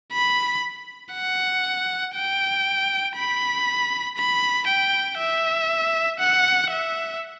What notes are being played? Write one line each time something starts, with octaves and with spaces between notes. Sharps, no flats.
B5
F#5
G5
B5
B5
G5
E5
F#5
E5